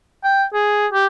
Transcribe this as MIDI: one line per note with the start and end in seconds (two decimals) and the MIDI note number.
0.24 0.44 79
0.54 0.87 68
0.93 1.06 67